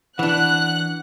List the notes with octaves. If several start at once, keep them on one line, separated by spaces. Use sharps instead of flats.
E3 D4 F#5 F#6